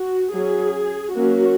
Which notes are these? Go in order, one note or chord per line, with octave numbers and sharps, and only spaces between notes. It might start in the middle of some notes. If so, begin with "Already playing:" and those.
Already playing: F#4
F#3 C#4 G#4
F#3 A#3 C#4 F#4